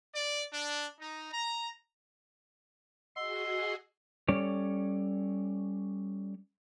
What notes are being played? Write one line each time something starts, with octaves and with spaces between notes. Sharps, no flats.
D5
D4
D#4
A#5
F#4 G#4 D#5 F#5 C6 E6
G3 C#4 A4 C#5 D5